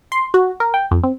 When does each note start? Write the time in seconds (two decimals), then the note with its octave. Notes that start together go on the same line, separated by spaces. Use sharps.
0.12 C6
0.34 F#4
0.60 A#4
0.74 G5
0.91 F2
1.04 C4